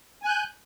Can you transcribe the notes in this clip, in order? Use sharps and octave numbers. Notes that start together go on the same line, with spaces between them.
G#5 F#6 G6